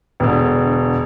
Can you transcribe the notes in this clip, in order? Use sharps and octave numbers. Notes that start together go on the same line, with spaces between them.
E1 D3